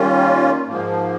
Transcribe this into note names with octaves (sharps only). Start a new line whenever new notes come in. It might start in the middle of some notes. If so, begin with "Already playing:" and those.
Already playing: D#3 G3 A#3 C#4 F4
G#2 F3 A#3